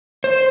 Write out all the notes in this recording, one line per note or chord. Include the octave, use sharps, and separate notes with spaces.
C5